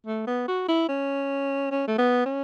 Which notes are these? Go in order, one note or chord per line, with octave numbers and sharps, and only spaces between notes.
A3
B3
F#4
E4
C#4
C#4
A3
B3
C#4